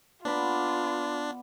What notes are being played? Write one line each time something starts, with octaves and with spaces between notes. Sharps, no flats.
B3 D4 F4 D5 B5